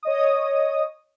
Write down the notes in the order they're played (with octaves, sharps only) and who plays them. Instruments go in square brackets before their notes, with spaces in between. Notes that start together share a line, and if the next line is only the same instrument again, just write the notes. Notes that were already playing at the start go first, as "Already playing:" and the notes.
[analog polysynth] C#5 D#5 D#6